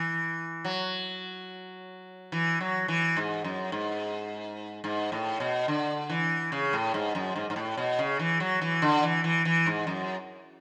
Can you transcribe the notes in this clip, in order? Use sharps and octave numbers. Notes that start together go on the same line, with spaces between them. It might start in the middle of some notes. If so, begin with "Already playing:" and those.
Already playing: E3
F#3
E3
F#3
E3
G#2
F#2
G#2
G#2
A2
B2
D3
E3
C#3
A2
G#2
F#2
G#2
G#2
A2
B2
C#3
E3
F#3
E3
D3
E3
E3
E3
G#2
F#2